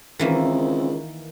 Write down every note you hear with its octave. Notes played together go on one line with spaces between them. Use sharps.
C#2 D#3 E3 A#3 C4